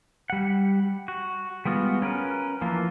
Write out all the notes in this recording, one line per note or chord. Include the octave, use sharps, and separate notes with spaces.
G3 F#5
F#4
G3 G#3 B3 F4 F#4
C#4 A#4 B4
E3 F3 A#3 F4